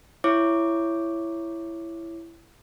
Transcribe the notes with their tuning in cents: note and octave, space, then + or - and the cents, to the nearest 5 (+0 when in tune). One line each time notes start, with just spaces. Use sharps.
E4 +15 C#5 +0 D6 +5